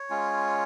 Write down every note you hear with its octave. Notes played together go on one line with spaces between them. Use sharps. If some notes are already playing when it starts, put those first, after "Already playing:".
Already playing: C#5
G#3 C#4 F4